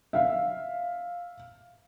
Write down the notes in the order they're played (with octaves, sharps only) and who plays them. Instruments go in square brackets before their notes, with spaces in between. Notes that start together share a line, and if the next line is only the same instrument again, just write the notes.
[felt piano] E5 F5